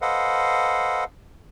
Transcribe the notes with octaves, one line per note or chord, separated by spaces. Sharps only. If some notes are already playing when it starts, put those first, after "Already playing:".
A4 B4 C5 D#5 F5 F#5